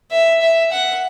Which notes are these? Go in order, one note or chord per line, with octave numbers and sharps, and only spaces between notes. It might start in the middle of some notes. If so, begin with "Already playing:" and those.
E5
E5
F#5